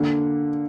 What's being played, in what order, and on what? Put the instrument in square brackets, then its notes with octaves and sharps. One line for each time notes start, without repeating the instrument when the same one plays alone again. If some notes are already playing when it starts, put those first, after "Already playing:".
Already playing: [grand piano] D3 [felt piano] A#3